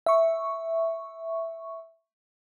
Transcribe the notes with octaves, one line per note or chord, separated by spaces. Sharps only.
E5 C#6